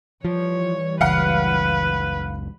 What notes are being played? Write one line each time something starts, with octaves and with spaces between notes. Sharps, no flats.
E3 F3 G3 C#5
F#1 C#2 B4 F5 F#5